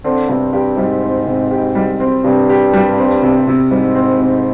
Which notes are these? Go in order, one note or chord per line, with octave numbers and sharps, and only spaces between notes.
D3 C4
G2 C3
G2 G4
G#2 G3
C4
C3
G4
G3
C4
G2 C3
G4
G3
C4
C3
C3
G#2 G3
C4
C3